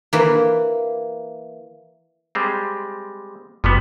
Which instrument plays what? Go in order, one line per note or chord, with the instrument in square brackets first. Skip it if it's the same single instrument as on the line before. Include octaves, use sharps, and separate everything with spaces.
[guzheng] E3 A#3
[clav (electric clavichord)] G3 G#3 C4
[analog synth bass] F#1 [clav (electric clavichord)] F3 G3 B3